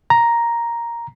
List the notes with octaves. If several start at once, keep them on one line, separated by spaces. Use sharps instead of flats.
A#5